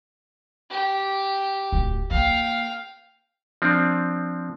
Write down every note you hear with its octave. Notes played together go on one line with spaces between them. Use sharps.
G4
D1
A#3 F5 G5
F3 C4 D4